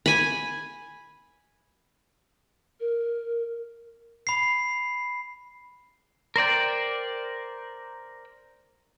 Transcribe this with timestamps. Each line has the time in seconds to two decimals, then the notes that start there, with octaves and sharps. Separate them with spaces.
0.06 G#5 B5
2.80 A#4
4.27 B5 C7
6.36 A#4 C5 D5 G5